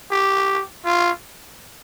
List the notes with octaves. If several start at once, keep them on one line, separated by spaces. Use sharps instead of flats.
G4
F4